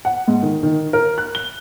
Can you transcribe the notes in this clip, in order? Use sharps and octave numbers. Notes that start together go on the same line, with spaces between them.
F#5
G#2
D#3
D#3
A#4
F#6
G7